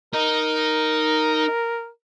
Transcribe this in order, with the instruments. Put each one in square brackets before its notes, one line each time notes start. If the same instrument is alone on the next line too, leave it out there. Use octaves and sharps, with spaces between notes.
[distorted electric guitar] D#4 [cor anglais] A#4